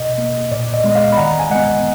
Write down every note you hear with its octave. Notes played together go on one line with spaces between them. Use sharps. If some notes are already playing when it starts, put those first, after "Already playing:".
Already playing: B2 D#5
A#3
A#2 D5
D#5
G#3 B3
D#5
D5 F5
B5
D#3 F#5 A#5
G#5
G#3 B3 D#5 F#5